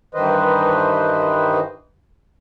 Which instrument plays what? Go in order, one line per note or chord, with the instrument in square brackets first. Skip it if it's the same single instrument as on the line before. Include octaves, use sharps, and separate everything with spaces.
[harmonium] G2 D#3 E3 B4 C5 D#5